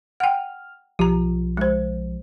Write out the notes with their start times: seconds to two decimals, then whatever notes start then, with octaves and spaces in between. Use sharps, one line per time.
0.20 F#5 G5 F6
0.99 B1 F3 G4 A#5
1.57 G#3 C5